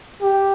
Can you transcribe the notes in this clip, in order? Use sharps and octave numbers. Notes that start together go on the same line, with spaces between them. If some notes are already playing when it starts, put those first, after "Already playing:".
G4